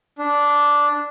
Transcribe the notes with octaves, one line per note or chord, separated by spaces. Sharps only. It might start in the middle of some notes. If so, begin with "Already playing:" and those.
D4